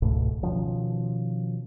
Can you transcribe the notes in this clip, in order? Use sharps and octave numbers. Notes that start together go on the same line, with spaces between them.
C#2 G#2 B2 A3
B2 D#3 F3 C#4